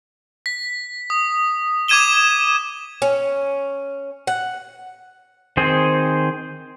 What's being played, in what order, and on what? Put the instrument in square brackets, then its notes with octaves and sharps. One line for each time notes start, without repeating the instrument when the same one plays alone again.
[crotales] B6
D#6
D6 D#6 G#6 D#7 E7 G7
[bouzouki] C#4
F#5
[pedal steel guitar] D#3 C4 G#4 C5